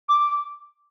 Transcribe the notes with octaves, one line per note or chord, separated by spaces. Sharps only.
D6